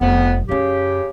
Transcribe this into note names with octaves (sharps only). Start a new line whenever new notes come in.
F1 F2 B3
F#2 C#3 C#4 G4